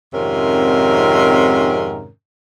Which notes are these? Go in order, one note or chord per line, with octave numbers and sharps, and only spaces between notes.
F2 G#2 C3 D#3 C#4 A#4